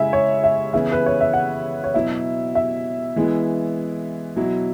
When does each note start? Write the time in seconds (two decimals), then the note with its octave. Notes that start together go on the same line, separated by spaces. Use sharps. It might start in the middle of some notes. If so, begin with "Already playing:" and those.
Already playing: C#3 G#3 E4 E5 G#5
0.13 C#5
0.44 E5
0.73 C#3 E3 B3 E4 E5
0.92 B4
1.06 C#5
1.21 E5
1.33 F#5
1.84 C#5
1.94 B2 F#3 E4 E5
2.55 E5
3.16 E3 G#3 B3 E4
4.36 B2 F#3 E4